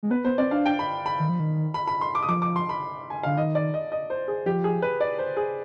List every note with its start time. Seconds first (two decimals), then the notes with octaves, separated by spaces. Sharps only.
0.03 G#3
0.10 B3 B4
0.24 B3 C5
0.38 C4 D5
0.51 D4 F5
0.66 G5
0.79 B5
1.06 B5
1.19 D#3
1.29 F3
1.40 D#3
1.74 B5
1.87 B5
2.01 C6
2.15 D6
2.22 D#6
2.28 F3 D6
2.42 D6
2.56 C6
2.69 B5
3.10 G#5
3.23 D3 F5
3.37 D#3 D#5
3.55 D5
3.74 D#5
3.92 D#5
4.10 C5
4.28 G#4
4.46 F3 G4
4.64 G#4
4.82 B4
5.00 D5
5.19 C5
5.37 G#4